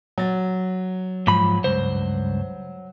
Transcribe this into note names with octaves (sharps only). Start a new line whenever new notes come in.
F#3 A6
G#2 F3 B5
C#2 G2 C5